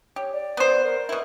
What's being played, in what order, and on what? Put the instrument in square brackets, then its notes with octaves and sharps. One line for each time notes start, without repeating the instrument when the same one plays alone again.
[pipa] G4 [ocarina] C#5
[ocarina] D5
[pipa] B3 C5
[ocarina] A#4
[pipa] B2 E4